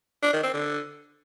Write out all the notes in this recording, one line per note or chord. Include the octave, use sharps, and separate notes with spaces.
D4
D#3
C4
D3